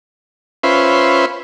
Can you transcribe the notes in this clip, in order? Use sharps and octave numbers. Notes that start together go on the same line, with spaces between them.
C#4 F4 B4 C5 E5